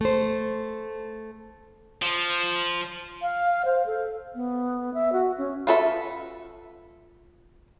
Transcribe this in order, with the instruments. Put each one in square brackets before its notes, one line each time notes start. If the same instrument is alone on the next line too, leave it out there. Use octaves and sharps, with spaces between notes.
[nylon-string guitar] A3 C5
[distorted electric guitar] F3
[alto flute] F5
C5
A4
B3
E5
F#4
C#4
[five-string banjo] F4 F#4 A4 B4 E5